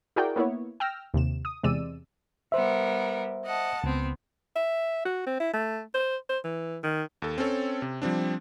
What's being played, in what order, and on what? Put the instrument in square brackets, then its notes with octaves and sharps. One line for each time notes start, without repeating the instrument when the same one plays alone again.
[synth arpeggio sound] E4 F#4 G#4 A#4 D5 G5
A#3 B3 E4 C#5
G5 E6 F6 A#6
D#2 C3 E7
D#6
E2 C3 G#3 D5 E6 D#7
[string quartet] G3 B3 A#4 [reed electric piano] C5 E5
[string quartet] D#5 F#5 A5
[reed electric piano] C#2 [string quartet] B3 C4
[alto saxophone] E5
F#4
C4
E4
A3
C5
C5
E3
D#3
[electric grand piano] D#2 A4
C4 C#4 A4 C#5
C3
F3 G3 C4 D4